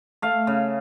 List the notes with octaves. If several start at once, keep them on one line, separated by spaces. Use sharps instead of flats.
A3 F5
C#3